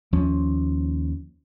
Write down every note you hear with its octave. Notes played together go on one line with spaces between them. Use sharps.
D#2 F3 C#4